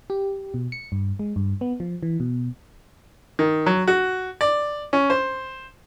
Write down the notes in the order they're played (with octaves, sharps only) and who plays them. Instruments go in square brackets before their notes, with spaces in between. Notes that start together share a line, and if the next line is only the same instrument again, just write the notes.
[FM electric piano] G4
B2
C#7
G2
G#3
G2
B3
F3
E3
B2
[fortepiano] D#3
F#3
F#4
D5
C#4
C5